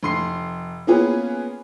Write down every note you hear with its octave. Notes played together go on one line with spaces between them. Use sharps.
F1 C6 C7
A#3 B3 C#4 F4 G#4 B4